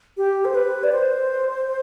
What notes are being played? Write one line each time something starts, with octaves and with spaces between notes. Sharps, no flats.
G4
C5
B4
D5
C5